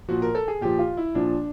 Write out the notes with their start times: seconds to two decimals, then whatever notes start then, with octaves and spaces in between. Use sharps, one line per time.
0.08 A#2 F3 F#4
0.22 A#4
0.35 A4
0.48 G#4
0.61 A#2 F3 G4
0.79 F4
0.97 E4
1.15 A#2 F3 D4